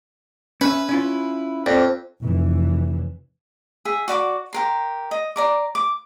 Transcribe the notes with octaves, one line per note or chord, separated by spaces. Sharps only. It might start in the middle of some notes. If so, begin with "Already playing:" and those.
C#4 B4 E5
C#4 E4 F4
F2 D5
F1 E3
G#4 E5
F#4 D5 A#5 D6
G4 A#4 C6
D#5
D5 A#5 D6
D6